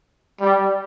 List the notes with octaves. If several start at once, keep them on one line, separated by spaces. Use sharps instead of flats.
G3